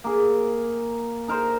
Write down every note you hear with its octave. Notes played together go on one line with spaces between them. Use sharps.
A#3 G#4
D#4 A#4 C5